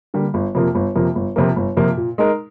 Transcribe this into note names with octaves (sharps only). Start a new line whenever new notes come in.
D3 G3 A#3
G1
F2 C3 F3 A#3
G1
F2 C3 F3 A#3
G1
F2 C3 F3 A#3
G1
F2 C3 F3 A#3
A#2
G#3 D#4 A#4